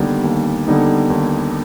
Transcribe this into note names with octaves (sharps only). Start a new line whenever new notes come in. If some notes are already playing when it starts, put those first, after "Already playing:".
Already playing: D#2 D3 G3 B3 D#4
D#2
D3 G3 B3 D#4
D#2